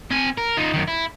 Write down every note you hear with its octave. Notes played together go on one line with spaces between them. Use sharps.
C4 G#5
A#4
D#4 F4
F#2 D#3
E4